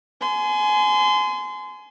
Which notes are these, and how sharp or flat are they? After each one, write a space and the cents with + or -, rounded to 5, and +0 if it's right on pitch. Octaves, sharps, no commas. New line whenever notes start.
G#5 +25 C6 -30